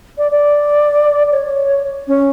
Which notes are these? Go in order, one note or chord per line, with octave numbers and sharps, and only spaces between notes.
D5
D5
C#5
C#4